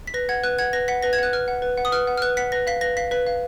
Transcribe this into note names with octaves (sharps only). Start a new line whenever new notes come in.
B6
B4 A#6
F#5 G#6
B4 F#6
F#5 G#6
B4 A#6
F#5 B6
B4 A#6
G#6
F#5 F#6
B4 F6
F#5
B4
F#5
D#6
B4 F6
F#5
F6
B4 F#6
F#5 B6
B4 A#6
F5 B6
B4 A#6
F5 B6
B4 B6
F5